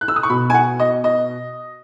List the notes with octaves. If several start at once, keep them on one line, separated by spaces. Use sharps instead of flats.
F#6
E6
D#6
C#6
B2 B5
G#5
F#5
D#5
D#5